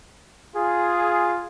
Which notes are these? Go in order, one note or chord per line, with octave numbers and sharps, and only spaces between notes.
F4 G#4